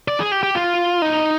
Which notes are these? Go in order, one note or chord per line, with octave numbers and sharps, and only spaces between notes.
D5
G#4
G4
G4
F4
D#4